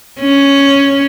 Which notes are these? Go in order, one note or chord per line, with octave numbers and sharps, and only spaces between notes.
C#4